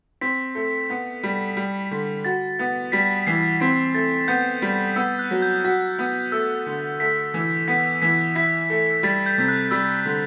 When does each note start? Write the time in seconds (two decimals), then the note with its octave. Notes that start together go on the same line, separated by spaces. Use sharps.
0.21 C4 B6
0.55 A3
0.90 B3
1.23 G3
1.57 G3
1.91 D3
2.25 F#4 A6
2.59 B3
2.92 G3 B6
3.27 E3 C7
3.60 C4 B6
3.94 A3 A6
4.28 B3 G6
4.62 G3
4.96 B3 E6
5.19 F#6
5.31 F#3
5.42 G6
5.64 F#4 B6
5.99 B3
6.32 A3 E6
6.66 D3
7.00 A3 B6
7.34 E3
7.68 B3 B6
8.02 E3 B6
8.35 E4 B6
8.70 A3
9.03 G3 A6
9.26 G6
9.38 C3
9.48 F#6
9.71 G3 E6
10.05 D3